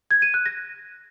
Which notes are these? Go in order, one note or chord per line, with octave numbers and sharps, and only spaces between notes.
G#6
D#7
F#6
A#6